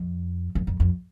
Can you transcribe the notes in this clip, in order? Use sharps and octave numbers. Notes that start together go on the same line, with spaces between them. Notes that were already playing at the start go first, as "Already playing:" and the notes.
Already playing: F2
F#2
F2
F2